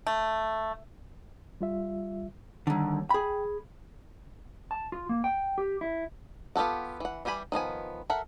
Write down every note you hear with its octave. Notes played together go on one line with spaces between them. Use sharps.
A3
G3 F4 E5
D#2 D3 D#3 G3
G#4 G5 B5
A5
F4
A#3
G5
G4
E4
B3 F4 G4 A4 F#5
E3 F#5
E3 G3 G4 G#5 B5
D#3 F3 B3 G#5
A4 A#4 E5 F#5